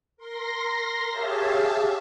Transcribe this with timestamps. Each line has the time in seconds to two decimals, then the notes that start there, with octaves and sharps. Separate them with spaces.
0.17 A#4 C6 A#6
1.10 G4 G#4 C#5 E5 F5 A5